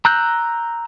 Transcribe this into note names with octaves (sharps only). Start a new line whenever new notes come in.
A#5 E6 F#6 G6